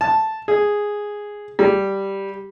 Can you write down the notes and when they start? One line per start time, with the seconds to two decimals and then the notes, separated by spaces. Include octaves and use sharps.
0.01 A5
0.48 G#4
1.59 G3